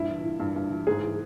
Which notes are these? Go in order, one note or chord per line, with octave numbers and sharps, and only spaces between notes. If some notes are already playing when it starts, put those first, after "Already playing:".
Already playing: G2 A#2 E4
E3
E3
G2
G2
E3
G#2 G#4
E3